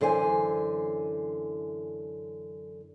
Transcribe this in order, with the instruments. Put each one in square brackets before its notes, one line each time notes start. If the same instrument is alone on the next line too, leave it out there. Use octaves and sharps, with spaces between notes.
[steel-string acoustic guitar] F#2 D3 E3 C5 G#5